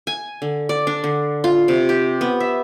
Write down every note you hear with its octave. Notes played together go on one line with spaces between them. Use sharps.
G#5
D3
D5
D4
D3
F4
C3
G4
B3
E5